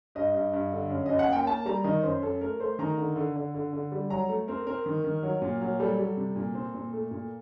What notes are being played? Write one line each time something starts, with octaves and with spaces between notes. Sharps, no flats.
G2 D#5
G2
G2
D3
F#2
F#2 D#5
F#5
A#3
G5
A#3 A5
G3 A#5
D#3 D#5
F#2 C5
F#2 A4
A3 A#4
A3 C5
D#3 A#5
D3
D3
D3
D3
D3
G3
F#3 A#5
A3
C4 A#4
C4 A#4
D#3
D#3
F#3
A#2
F#3
G3 A4
G3
C3
A#2
C4
A#2
A3
A#2